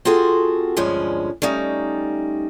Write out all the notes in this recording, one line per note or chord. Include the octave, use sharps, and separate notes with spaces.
C4 F4 F#4 G#4 A4
D2 G2 F3 G#3 C#4 G#5
G3 A3 C#4 D#4